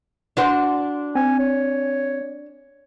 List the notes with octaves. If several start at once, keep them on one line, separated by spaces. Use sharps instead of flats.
D4 F#4 C5
C4 G#5
C#5